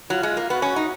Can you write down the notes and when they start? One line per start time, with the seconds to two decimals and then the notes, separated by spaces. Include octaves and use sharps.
0.09 F#3 F4
0.23 G#3
0.37 A#3
0.50 B3 F#4
0.62 C#4
0.76 D#4